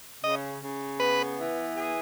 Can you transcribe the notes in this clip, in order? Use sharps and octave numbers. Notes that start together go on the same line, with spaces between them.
C#3 D#5
C#3
B3 B4
E3
G#4